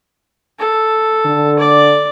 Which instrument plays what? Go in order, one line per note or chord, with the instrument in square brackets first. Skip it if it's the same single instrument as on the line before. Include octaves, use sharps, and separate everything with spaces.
[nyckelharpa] A4
[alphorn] D3
[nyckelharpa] D5